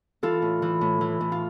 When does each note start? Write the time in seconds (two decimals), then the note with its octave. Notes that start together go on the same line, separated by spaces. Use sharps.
0.23 E3 F4 A4
0.42 A2
0.62 E3
0.81 A2
1.01 E3
1.21 A2
1.32 F4